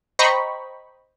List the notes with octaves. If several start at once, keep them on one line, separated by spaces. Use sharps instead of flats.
C5 D#5 G5 A#5 B5 C#6